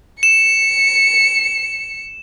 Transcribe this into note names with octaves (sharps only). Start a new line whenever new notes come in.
C#7 E7